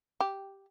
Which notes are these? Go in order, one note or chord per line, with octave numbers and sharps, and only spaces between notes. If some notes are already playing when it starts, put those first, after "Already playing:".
G4